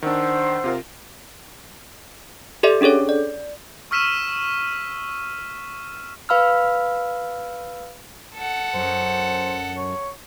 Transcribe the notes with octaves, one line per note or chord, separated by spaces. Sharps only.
D#3 D4 C5 F#5 E6
C3 F4 A#4
G4 A4 D5 E5
C#4 D4 G#4 A4 C#5
D5
C#6 E6 F6 B6 D#7 E7
B4 F5 B5 E6 F6
A4 F#5
F#2 C5
C#5